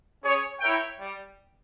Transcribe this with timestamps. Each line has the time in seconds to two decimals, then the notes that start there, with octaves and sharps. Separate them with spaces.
0.22 C#4 G#4 C#5
0.60 E4 A#4 C#5 E5 G5
0.98 G3